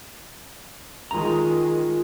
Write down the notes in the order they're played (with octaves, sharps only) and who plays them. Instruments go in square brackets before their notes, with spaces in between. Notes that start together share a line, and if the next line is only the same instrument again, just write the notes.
[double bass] D#3 G#3 [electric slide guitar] F4 A#5